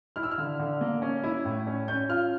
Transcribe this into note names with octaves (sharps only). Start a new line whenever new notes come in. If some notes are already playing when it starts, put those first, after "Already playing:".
E4 F6
E6
F6
D3
D3
A#3
C#4
E4
A2
C#4
C#4 G6
F4 F6